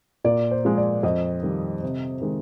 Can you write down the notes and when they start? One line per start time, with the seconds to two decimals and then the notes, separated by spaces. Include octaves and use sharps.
0.24 A#2 D5
0.51 C5
0.65 F3 G#3
0.78 D5
1.03 F2 D#5
1.43 D#3 G3
1.83 C3
2.21 D#3 G#3